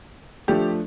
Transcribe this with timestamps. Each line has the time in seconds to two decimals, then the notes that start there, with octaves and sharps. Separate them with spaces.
0.48 F3 A3 D4 G4